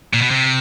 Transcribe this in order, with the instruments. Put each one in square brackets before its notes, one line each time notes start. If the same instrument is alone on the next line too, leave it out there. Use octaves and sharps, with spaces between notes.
[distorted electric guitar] A#2
B2
C3